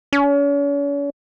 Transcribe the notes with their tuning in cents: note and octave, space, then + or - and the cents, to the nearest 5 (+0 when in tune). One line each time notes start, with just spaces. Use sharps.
C#4 +40